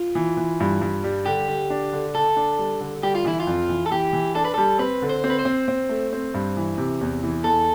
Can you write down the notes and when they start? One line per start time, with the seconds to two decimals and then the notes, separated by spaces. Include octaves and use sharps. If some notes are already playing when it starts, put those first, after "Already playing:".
Already playing: F4
0.15 E3
0.37 E3
0.60 G2
0.81 G2
1.04 G3
1.26 D3 G4
1.48 D3
1.70 D4
1.93 D3
2.14 D3 A4
2.36 D4
2.58 G3
2.81 D3
3.03 G3 G4
3.15 F4
3.25 E3 E4
3.40 F4
3.47 F2
3.69 E3
3.86 A4
3.92 E3 G4
4.13 E3
4.35 D4 A4
4.45 B4
4.54 G3 A4
4.79 C4 B4
5.02 D3
5.09 C5
5.24 C4
5.30 B4
5.39 C5
5.45 C4
5.68 C4
5.89 A3
6.13 C4
6.34 G2
6.57 E3
6.78 C3
7.01 E2
7.23 E3
7.44 E2 A4